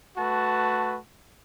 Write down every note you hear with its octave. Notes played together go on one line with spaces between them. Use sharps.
A3 F#4 B4 A5